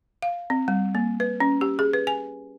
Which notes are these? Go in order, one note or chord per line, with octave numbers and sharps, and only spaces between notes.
F5
C4
G3
A#3
B4
C#4
G4
G#4
B4
G#5